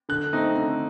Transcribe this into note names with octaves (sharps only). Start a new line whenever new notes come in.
D3 F#6
A3 C4 D#4
D3